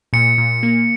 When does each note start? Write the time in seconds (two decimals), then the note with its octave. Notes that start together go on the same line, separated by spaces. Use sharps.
0.13 A#2 C#7
0.38 A#2
0.63 A#3